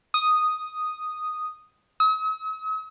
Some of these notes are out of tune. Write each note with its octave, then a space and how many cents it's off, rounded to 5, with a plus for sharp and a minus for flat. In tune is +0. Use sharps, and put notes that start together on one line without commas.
D#6 -5
D#6 +45